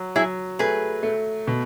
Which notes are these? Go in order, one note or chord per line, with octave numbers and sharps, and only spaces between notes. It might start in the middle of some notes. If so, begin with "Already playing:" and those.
Already playing: F#3
F#3 E4 G#4
A3 G#4 B4
A3
B2